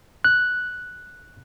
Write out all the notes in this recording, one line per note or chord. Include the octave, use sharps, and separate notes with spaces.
F#6